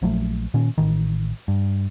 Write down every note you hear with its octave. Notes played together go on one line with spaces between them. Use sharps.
A#1 F3 F#3 A3
A#2 D#3 C#4
A1 D#3
G2